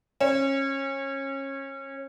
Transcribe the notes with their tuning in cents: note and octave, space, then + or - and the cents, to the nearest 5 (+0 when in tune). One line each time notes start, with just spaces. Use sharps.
C#4 -25